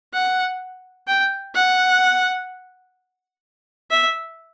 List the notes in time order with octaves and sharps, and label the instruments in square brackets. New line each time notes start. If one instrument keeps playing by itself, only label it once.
[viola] F#5
G5
F#5
E5